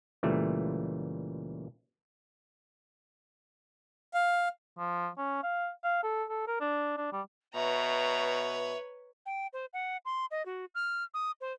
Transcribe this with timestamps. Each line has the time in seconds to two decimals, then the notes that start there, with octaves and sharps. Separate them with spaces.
0.23 C#2 A#2 E3 G3 A3
4.14 F5
4.78 F3
5.18 C#4
5.43 F5
5.84 F5
6.03 A4
6.29 A4
6.47 A#4
6.60 D4
6.97 D4
7.12 G3
7.55 B2 B4 C#5 E5 A#5
9.26 G5
9.53 C5
9.73 F#5
10.05 C6
10.31 D#5
10.46 F#4
10.75 F6
11.14 D#6
11.41 C5